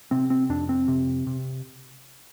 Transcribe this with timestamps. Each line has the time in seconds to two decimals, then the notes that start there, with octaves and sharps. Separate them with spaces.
0.11 C3 C4
0.30 C4
0.49 F2 D4
0.69 C4
0.88 C3
1.27 C3